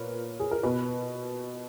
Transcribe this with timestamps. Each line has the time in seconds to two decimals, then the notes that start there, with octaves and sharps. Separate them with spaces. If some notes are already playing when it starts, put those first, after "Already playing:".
Already playing: A#2 A#4 B4 C#5
0.40 G#4
0.51 A#4
0.63 B2 B4